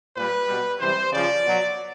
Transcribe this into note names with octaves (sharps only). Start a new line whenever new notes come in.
A#2 G3 B4
B2 G3
C3 E3 G3 C5
C#3 F3 D5
B2 F#3